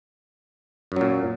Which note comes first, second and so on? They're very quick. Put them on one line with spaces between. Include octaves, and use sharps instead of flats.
F#2 F#3 A#2